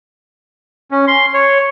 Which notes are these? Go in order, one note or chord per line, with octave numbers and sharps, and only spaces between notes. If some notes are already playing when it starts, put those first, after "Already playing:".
C#4
C6
C#5